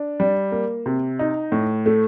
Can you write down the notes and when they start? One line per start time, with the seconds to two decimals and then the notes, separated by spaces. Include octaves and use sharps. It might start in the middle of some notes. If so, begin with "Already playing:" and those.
Already playing: D4
0.20 G3
0.52 A#3
0.86 C3
1.19 D#4
1.52 A2
1.86 A3